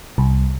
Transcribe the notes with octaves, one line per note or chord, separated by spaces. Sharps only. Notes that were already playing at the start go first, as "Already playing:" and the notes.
C2